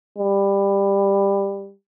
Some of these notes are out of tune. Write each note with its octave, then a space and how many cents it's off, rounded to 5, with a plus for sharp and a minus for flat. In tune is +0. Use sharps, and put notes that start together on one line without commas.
G3 +15